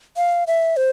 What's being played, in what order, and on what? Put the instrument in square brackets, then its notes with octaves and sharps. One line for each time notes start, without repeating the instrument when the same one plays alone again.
[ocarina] F5
E5
C5